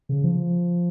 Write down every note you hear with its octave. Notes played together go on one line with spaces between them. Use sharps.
C#3
F3